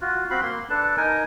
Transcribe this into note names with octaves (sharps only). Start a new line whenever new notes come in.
F4 F#4
C4 F#4 F5 B5
A#3 C6
D4 A4 B4 A5
D#4 A#4 G#5